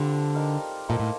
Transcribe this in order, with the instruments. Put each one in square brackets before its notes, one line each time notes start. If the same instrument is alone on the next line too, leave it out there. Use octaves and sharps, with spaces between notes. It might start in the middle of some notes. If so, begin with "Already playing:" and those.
Already playing: [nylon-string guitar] D3 [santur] G3 C4 D4 F4 A4
[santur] D#4 A#4 D5 F5
[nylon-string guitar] A#2 [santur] A#3 D#4 A4 C5
[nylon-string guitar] A2